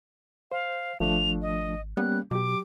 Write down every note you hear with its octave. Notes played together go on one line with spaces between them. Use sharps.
C5 F5
G#1 F3 A3 D4 F7
D#5
G3 A#3 B3 C#4 F#6
B2 F#3 G4 D6